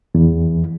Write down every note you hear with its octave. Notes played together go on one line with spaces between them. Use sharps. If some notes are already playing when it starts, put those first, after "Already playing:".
E2